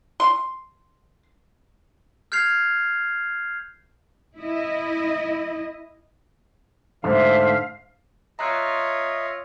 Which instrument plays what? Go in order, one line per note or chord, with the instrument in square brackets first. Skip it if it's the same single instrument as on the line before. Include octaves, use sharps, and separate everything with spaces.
[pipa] C6
[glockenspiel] F6 G6 G#6 C7 F7
[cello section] E4 D#5
[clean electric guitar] G#2 D3 A3 [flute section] C5 E5 [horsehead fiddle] F5
[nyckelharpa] F4 C#5 [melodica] D#5 E5 [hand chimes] A#5 F#6